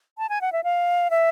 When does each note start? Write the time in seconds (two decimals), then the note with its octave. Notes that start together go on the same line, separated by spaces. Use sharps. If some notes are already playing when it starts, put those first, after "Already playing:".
0.18 A5
0.29 G#5
0.41 F#5
0.53 E5
0.64 F5
1.10 E5